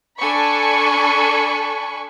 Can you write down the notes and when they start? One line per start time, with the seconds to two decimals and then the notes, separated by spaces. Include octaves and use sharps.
0.17 D4 A4 G#5 B5 C#6